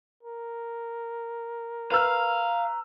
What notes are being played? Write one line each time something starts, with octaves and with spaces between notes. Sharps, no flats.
A#4
B4 F5 A#5 E6 F6